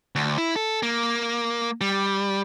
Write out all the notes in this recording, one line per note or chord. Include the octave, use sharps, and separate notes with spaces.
D2
E4
A4
A#3
G3